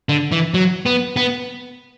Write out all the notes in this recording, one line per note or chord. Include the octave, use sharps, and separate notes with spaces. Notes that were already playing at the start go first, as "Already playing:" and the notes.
D3
E3
F#3
B3
B3